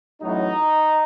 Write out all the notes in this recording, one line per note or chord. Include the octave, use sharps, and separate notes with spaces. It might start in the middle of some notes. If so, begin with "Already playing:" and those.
A1 A2 F#3 D#4